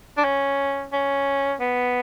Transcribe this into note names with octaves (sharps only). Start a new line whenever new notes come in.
D4
C#4
C#4
B3